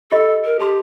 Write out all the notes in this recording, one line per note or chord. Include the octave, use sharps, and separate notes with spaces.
F4 G4 A4 D#5
A#4
G4 A4 A5 C6